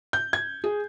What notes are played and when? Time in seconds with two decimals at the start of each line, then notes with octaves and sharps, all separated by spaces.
0.13 G6
0.33 G#6
0.64 G#4